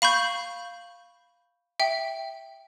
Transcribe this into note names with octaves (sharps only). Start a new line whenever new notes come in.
F5 B5 C#6 G6
E5 G5